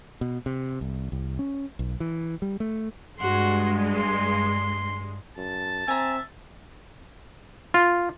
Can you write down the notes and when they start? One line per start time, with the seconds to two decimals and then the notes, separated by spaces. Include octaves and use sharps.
0.21 B2
0.46 C3
0.81 C2
1.12 C2
1.39 C#4
1.79 B1
2.00 E3
2.42 G3
2.60 A3
3.19 G2 G#3 F#4 C6
3.95 C6
5.37 F#2 A5
5.88 C4 E5 G#5 A#5
7.74 F4